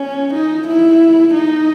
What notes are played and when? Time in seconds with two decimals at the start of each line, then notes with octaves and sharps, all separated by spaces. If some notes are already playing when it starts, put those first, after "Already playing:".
Already playing: C#4
0.34 D#4
0.68 E4
1.34 D#4